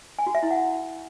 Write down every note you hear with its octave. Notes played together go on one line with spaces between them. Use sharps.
G#5
F#4
E5
E4
F#5